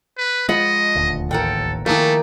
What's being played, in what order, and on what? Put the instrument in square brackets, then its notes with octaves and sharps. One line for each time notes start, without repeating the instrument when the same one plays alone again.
[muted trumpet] B4
[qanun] F3 F#5 B5 [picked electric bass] G#3 [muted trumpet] D#5
[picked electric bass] D#1 D2
[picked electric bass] D1 A1 D#2 [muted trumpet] A4 [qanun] A#4 F#5 G5
[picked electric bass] D#3 F3 [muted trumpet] A3 [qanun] A#3 G5 [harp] E4 G#4 A#4